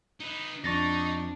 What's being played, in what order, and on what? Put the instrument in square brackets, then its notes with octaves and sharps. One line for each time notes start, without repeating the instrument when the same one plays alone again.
[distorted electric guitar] D#4 B4
[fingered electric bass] F2 [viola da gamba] D4 [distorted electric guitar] D#4 [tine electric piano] C#6 A6 A#6